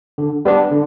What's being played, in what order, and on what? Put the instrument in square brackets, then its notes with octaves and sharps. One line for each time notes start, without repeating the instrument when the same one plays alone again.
[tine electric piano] D3
G3 B3 D4
D3